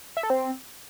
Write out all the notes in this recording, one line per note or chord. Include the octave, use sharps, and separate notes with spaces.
E5
A4
C4